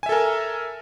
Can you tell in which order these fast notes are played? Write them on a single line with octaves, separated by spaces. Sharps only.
G#5 E5 A4 A#4